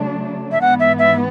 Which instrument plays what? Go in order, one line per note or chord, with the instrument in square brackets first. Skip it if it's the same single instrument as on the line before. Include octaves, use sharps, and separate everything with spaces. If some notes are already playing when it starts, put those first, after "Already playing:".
Already playing: [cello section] C#3 F#3 A3 D4
[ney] E5
[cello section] G#2 E3 B3 [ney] F#5
[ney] E5
E5